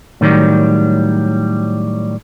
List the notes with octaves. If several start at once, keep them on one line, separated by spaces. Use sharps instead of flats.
A2 D#3 F#3 G3